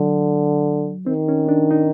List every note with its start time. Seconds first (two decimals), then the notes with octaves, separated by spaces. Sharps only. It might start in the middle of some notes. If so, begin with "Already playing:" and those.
Already playing: D3 F#3
1.06 D#3 C4
1.29 C#4
1.49 D4
1.71 D#4